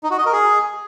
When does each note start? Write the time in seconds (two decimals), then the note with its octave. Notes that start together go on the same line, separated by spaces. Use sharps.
0.03 D#4
0.11 F#4
0.18 D#5
0.26 A#4
0.33 G#4